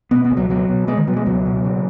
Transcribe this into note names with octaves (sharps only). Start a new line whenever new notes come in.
B2 B3
B3
C#2
F#3
B2 F#3
B2
B2 G#3
D#3
B2 F#3
G#3
C#2 F#3
B2
C#3